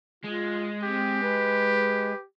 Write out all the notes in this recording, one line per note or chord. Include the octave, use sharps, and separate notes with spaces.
G#3 F4
C4 G4
B4